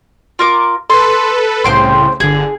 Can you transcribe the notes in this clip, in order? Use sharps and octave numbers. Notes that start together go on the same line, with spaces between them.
F4 A#4 D6
A4 B4 C6
C2 A2 C#3 C5 G5 C6
G1 D3 G#4